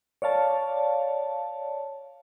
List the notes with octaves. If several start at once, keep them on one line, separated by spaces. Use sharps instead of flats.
C#5 D5 F5 A5